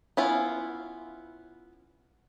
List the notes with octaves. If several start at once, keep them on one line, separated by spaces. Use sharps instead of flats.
B3 C#4 E4 F4